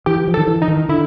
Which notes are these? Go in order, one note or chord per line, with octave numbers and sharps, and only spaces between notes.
E3 G4
F3
A4
D#3
E3
D#4
D#3
D3 E4